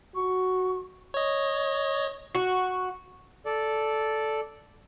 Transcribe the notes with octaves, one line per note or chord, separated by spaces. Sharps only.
F#4 C#6
C#5 D#5
F#4
A4 D5